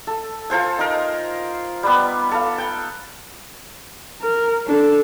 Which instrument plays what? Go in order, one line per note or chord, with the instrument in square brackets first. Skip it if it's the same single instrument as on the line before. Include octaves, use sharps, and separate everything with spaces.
[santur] A4
F4 A4 C5 G#5
D#4 A#4
G3 B3
A4 F5
G5
[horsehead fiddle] A#4
D4 A4